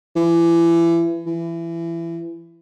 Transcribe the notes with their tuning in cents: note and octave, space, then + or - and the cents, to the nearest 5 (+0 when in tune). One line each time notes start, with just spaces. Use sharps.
E3 +30
E3 +25